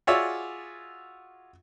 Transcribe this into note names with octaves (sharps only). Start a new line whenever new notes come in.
F4 F#4 G#4 C#5 D5 E5